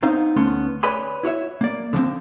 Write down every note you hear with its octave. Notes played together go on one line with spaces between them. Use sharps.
B3 C4 D#4 C5 F5
D2 A3 B3 C#4 C6
B4 C#5 D5 G#5 B5 C6
E4 F#4 C#5 E5
A#3 D5
D3 F3 G#3 C4